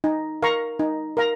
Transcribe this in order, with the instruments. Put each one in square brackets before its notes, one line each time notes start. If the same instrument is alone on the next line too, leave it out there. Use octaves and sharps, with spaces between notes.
[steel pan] D#4
A#4 F5 A#5 C#6
D#4
A#4 F5 A#5